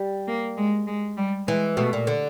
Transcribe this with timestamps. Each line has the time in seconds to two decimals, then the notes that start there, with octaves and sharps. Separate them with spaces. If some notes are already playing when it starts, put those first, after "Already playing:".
Already playing: G3
0.28 A#3
0.57 G#3
0.87 G#3
1.17 G3
1.47 E3 G#3
1.77 B2 A3
1.93 A#2
2.07 D3